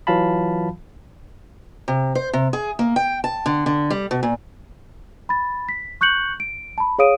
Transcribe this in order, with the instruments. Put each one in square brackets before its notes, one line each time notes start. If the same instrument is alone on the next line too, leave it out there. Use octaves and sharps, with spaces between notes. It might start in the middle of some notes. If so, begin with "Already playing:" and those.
[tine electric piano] E3 F#3 F4 F5 A5 B5
[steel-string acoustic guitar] C3
C5
C3
G#4
A#3
G5
A5
D3
D3
G3
B2
A#2
[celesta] B5 A6
B6
C#6 F#6 G6 C#7 F#7
D7
A5 B5
G#4 C#5 F5 D#6 D7 D#7